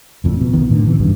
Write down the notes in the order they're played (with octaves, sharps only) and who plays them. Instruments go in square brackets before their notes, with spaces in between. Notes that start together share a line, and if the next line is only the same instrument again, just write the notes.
[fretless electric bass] F#1 F2 A2
F2 B2
A#1 D#3 B3
A2 D3 D#3
C3 E3
A1 D2 G2